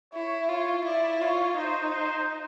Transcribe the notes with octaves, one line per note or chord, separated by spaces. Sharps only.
E4 C#5
F4 C#5
E4 D5
F4 C#5
D#4 C5
C5